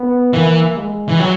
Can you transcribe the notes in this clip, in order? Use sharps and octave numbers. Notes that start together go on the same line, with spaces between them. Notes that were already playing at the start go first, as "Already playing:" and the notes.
Already playing: B3
E3 A#3
G#3
E3
F#3